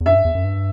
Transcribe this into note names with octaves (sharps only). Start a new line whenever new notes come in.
E2
F#2 E5
G2
E2
F#2
G2